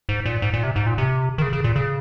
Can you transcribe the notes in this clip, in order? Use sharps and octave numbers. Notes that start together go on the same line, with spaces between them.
G#2
A#2
G#2
A#2
C3
G#2
A#2
C3
D#3
C#3
C#3
A#2
C#3